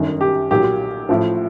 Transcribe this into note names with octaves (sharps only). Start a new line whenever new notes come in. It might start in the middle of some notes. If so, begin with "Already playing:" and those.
Already playing: G1 F#2 D#3
G4
B1 A#2 F#3 G4
A1 A2 F3